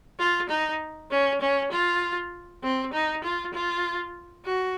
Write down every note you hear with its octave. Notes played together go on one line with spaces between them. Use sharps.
F4
D#4
C#4
C#4
F4
C4
D#4
F4
F4
F#4